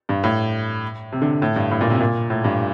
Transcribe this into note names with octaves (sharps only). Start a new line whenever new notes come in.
G2
A2
C3
D3
A2
G2
A2
A#2
C3
A#2
A2
G2